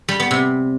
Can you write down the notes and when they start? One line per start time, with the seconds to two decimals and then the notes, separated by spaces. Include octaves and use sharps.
0.09 G3
0.20 B3
0.31 C3